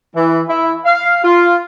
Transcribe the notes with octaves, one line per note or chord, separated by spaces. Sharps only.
E3
E4
F5
F4